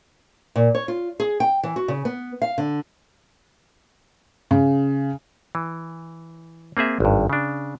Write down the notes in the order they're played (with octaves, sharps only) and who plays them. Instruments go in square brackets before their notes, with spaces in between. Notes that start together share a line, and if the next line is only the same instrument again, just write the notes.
[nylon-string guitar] A#2
C#5
F4
G#4
G5
E3
F#4
C#3
B3
F5
D3
[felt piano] C#3
[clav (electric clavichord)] E3
A#3 C4 G#4 E5
G#1 G2
C#3 D4